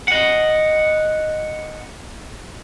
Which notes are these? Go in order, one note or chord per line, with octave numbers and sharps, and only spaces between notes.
D#5 F#5